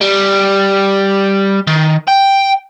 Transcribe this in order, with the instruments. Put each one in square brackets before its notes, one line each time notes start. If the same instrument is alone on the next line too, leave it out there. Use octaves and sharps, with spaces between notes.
[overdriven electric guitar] G3
D#3
G5